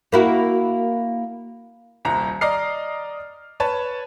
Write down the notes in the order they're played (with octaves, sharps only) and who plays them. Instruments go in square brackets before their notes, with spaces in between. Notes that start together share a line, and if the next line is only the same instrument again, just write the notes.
[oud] A#3 E4 F#4
[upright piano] D#1 C2 A#5
D5 D#5 A#5 F6 C7
B4 C#5 A5